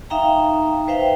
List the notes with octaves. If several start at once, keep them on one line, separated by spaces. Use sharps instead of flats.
D#4 E5 F5 G5 A#5
B4 C5 E5 F5 G5